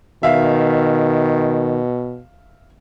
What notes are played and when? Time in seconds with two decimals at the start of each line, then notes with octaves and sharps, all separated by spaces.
0.23 B2 D#3 E5 F5